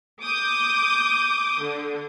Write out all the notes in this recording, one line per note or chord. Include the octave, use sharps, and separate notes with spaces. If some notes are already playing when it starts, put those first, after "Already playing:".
D6 D#6 G6
D3